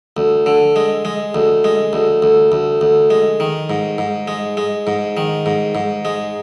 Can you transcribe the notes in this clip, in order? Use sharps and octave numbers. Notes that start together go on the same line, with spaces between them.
D2
D3
G#3
G#3
D2
G#3
D2
D2
D2
D2
G#3
D#3
G#2
G#2
G#3
G#3
G#2
D#3
G#2
G#2
G#3